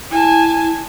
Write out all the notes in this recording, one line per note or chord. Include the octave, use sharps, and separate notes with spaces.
E4 G#5 A5